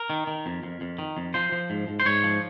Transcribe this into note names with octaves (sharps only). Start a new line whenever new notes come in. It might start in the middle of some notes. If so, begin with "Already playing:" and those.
Already playing: A#4
D#3
D#3
F2
F2
F2
D#3
F2
F3 C5
F3
G#2
G#2
C5
G#2 C#5
F3